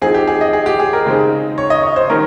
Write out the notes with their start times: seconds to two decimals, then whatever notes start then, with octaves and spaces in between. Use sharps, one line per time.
0.02 F3 C4 D#4 G#4
0.14 G4
0.27 G#4
0.41 D#5
0.53 G#4
0.66 G4
0.80 G#4
0.93 A#4
1.06 C#3 G#3 C4 D#4
1.58 C#5
1.70 D#5
1.83 C#5
1.96 C5
2.10 D#3 G3 C#4 A#4